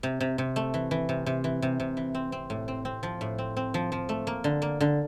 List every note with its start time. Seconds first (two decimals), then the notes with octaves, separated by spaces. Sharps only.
0.03 C3
0.20 C3
0.38 C3
0.56 A3
0.74 E3
0.91 E3
1.09 C3
1.26 C3
1.44 E3
1.62 C3
1.80 C3
1.97 E3
2.15 C4
2.32 C4
2.50 A2
2.68 C4
2.85 C4
3.03 F3
3.21 A2
3.38 C4
3.57 C4
3.74 F3
3.92 F3
4.09 A3
4.27 A#3
4.44 D3
4.62 A#3
4.80 D3